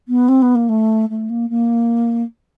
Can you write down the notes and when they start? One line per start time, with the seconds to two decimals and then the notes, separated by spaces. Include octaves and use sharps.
0.08 B3
0.28 C4
0.42 B3
0.55 A#3
0.69 A3
1.09 A3
1.29 A#3
1.50 A#3